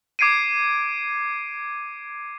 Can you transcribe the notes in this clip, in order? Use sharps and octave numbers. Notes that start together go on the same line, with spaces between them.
D6 G#6 C7 D7 D#7